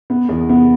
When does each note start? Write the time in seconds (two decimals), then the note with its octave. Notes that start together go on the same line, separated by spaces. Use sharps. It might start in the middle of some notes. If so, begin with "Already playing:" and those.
0.10 B3
0.29 E2
0.49 B3